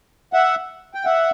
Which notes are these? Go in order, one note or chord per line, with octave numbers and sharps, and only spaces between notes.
E5 F#5
G5
E5 F#5